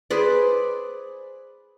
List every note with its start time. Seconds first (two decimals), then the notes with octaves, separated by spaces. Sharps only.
0.10 G#4 B4 C5 D5